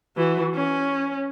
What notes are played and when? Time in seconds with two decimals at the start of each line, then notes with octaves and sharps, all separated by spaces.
0.16 E3 F#4
0.54 C#4